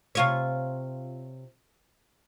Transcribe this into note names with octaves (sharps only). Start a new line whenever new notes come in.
C3 F4 C#5